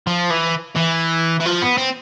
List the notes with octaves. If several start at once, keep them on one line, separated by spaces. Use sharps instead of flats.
F3
E3
E3
E3
F3
B3
C4